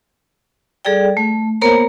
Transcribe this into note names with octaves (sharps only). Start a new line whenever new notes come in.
G3 G#4 A4 D5 G5
A3
A#3 B3 A#4 C5 C#5 A#5